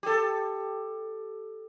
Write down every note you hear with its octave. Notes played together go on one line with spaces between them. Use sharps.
G4 A4